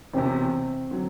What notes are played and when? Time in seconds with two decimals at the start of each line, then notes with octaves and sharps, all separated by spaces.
0.14 E1 E2 C3 C4
0.91 D3 F#3